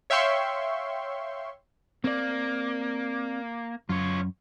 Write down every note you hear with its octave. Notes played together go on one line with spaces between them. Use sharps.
C#5 E5 F5 G5 C6 C#6
A#3 C4 D5
F#2 F4 C#5